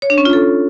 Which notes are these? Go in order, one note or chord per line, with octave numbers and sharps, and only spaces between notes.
C#5
D4
C#4
F4
A4